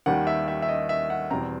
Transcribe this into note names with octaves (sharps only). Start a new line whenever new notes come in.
D#2 D#3 G3 F#5
E5
E5
E5
D#5
E5
F#5
E2 B2 G3 C4 A#5